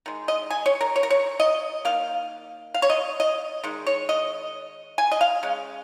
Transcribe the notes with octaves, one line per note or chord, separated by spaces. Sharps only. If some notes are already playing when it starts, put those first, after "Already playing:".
D#3 G#3
D#5
G#5
C#5
A#4
C#5
A#4
C#5
D#5
D#3 A#3 F5
F5
C#5
D#5
D#5
D#3 G#3
C#5
D#5
G#5
D#5
F5
C#3 G#3